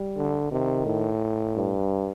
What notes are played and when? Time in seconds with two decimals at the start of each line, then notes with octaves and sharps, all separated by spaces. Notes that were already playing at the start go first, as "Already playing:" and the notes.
Already playing: G3
0.16 D3
0.51 C3 D#3
0.86 A2
1.56 G2